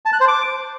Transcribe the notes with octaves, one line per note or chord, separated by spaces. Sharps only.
A5
F#6
C5
D6